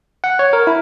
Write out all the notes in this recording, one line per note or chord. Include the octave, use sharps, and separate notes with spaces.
F#5
C#5
A#4
E4